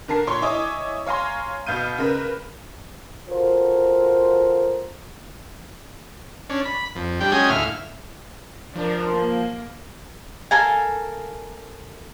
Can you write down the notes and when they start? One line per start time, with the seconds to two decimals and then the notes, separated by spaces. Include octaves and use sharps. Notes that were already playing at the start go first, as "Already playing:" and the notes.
0.08 D3 A#4 A5 C7
0.27 A#2 C#5 C6
0.42 E4 C#5 D#5 G#5 D6
1.06 C#5 F5 G#5 A#5 C6
1.66 B2 F5 G6 D#7
1.98 C#3 A#4 B4
3.28 F4 F#4 A4 A#4 C5
6.50 C#4 D4
6.65 B5
6.95 F2
7.21 G3 D4 G5
7.32 F#3 G#3 C#4 G5 G#5 D#6
7.50 D2 A2 E4 F5 F6
8.76 F3 D4 A#4
9.12 A#3
10.51 A4 A#4 F5 G#5